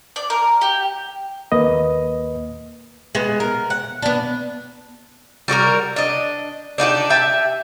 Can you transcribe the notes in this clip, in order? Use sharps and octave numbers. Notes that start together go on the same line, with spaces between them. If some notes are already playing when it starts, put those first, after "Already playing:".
D5
A#4
G4
D#2 A#3 B4 D#5
G#3 B3
A#4
F#5
B3 D4
G3 F#4 G#4 A#4
D4 D#5
D4 D#4 F#4 G4
G4 E5 A5